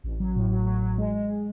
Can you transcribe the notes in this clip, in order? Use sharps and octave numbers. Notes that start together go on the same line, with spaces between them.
A1
F#3
A2
F#3
F#3
F#3
G#3
G#3